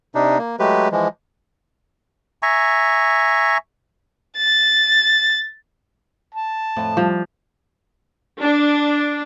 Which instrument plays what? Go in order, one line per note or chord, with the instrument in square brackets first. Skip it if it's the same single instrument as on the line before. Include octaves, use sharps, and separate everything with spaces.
[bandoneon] C3 D4 D#4
A#3
F#3 G#3 A3 G4 B4
E3 F3 G#3
[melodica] E5 G#5 A#5 C#6
[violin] A6
[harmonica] A5
[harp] F2 A2 F3
[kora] F3 [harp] G3
[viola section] D4